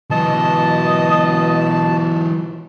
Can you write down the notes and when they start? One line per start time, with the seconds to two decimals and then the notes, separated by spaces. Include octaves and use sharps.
0.11 B2 E3 F#3 D#5 A5